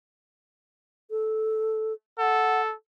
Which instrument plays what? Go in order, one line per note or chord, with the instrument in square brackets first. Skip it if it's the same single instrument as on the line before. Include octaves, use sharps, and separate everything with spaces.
[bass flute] A4
[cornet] A4 [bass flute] F#5